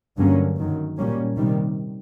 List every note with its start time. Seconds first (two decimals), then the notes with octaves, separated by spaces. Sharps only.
0.17 G2 D3 F#3 A#3 C#4
0.57 F#2 D#3 F#3
0.98 A#2 G3 A#3 C#4
1.37 C3 D#3 G3